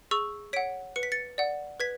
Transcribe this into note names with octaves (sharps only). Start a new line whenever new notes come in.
G#4 C#6 E6
C#5 F#5 B6 D7
B4 C#7
B6
A6 C#7
D5 F#5
B4 G#6 B6